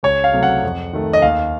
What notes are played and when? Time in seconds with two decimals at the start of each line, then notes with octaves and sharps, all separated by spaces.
0.03 C#2 C#5
0.24 F5
0.33 C3 F#3 A3
0.43 F#5
0.63 F2
0.93 D#3 A3
1.13 D#5
1.22 D#2 F5